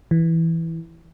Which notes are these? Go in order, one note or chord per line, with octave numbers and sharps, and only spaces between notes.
E3